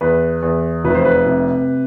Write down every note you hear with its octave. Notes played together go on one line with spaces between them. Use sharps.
E2 B4
E2
F1 B4
C5
B4
C3